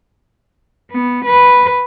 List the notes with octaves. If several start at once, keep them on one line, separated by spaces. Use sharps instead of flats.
B3
B4